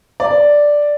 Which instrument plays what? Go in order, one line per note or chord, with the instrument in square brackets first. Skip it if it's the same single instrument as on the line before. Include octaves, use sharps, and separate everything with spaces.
[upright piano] D5